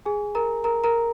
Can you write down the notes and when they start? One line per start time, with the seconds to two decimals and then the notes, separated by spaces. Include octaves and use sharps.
0.06 G#4 G#5
0.35 A#4 A#5
0.64 A#4 A#5
0.84 A#4 A#5